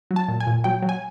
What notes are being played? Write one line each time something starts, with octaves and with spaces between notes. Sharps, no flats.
F#3
A5
A#2
G#5
A#2
F#3 G5
F#3
G#5